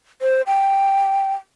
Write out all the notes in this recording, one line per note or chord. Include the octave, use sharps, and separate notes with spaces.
C5
G5